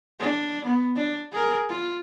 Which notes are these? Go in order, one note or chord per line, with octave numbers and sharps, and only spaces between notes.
D4
B3
D4
G#4 A#4
F4